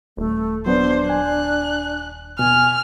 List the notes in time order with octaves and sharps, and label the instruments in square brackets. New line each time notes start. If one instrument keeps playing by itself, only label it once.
[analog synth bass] D#1 [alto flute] A3
[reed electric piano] F#3 B3 [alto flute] D4 [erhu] C5
[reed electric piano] G#5 [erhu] F#6
[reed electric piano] B2 [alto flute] G#5 [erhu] F6